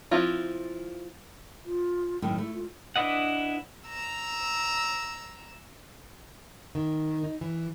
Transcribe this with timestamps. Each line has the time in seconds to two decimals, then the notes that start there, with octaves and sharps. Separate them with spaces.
0.11 F3 C4 E4 F4
1.65 F4
2.22 F#2 A2 D#3 G5
2.38 A3 E4
2.54 F4
2.96 D4 E4 B4 D#5 F#5
3.88 A#5 E6
6.75 D#3
7.24 D#4
7.41 E3